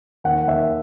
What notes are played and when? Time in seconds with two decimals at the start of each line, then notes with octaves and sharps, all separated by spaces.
0.24 D#2 F#5
0.47 D#2 E5